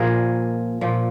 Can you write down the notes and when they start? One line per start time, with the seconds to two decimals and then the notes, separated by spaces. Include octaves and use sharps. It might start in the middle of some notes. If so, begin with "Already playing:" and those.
Already playing: A#2 F3 G#4 A#4
0.81 A#2 F3